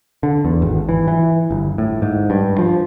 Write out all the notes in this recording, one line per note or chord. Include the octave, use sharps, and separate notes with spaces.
D3
E2
G#1
E3
E3
G1
A2
G#2
G2
F3